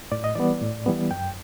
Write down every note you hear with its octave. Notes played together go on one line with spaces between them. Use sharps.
A2 D5
D#5
E3 G3 B3 D5
A2
E3 G3 B3
F#2 G5